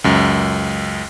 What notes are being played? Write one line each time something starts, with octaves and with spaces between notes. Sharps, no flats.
C#2 F#2